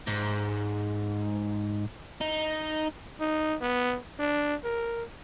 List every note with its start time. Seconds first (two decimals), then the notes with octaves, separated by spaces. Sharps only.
0.07 G#2
2.21 D#4
3.20 D#4
3.61 B3
4.20 D4
4.64 A#4